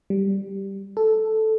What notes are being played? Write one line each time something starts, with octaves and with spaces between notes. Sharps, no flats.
G3
A4